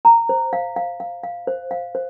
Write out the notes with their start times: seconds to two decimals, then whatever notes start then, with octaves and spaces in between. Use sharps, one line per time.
0.05 A#5
0.29 C5
0.53 F5
0.76 F5
1.00 F5
1.24 F5
1.47 C5
1.71 F5
1.95 C5